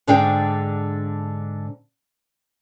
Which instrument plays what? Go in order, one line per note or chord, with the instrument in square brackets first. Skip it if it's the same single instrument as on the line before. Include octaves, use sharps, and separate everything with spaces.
[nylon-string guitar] G#2 D3 D4 G#4 F5 G5